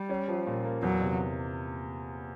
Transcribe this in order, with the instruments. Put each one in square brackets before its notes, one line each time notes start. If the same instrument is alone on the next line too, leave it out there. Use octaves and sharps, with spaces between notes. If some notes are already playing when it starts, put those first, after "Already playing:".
Already playing: [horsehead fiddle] G3
[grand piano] C#4
F3
A#2
A#3
[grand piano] E2 [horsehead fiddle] F#3
[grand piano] C3